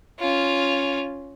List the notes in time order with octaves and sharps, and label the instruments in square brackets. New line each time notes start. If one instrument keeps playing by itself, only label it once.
[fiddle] C#4 F4